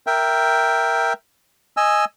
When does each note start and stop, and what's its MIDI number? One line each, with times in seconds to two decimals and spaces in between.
0.07 1.13 70
0.07 1.13 76
0.07 1.13 79
1.77 2.05 75
1.77 2.05 80
1.77 2.05 88